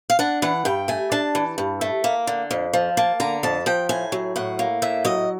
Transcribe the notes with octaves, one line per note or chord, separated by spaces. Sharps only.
F5
D4 F#5
E3 F#5
G2 G5
A3 G#5
D4 A5
E3
G2
A3
A#3
D3
F2
F3
A#3 A5
D3 A#5
F2 A5
F3 G5
A2 G#5
F#3
A2 F#5
A#3
A2 E5
F#3 D#5